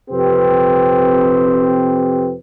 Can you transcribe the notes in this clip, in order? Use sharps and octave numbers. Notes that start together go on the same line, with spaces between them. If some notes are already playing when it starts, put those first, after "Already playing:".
F2 C3 C4 G4 B4